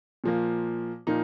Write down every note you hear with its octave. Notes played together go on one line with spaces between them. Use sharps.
A#2 F3 A#3
A#2 F3 A#3 D#4